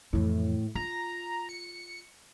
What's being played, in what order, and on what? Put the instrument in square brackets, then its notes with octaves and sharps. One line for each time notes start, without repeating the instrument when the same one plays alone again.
[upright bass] F2 E3 [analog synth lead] A2
[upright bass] F4 [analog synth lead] A#5
[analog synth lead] C#7